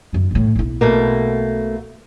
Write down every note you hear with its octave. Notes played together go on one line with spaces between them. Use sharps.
F#2 D#3
B1 A2
B1 E4
B2 A3 A#3